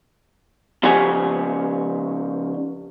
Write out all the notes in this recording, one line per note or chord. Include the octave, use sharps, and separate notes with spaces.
C#3 F3 C#4 G4 F#5 G#5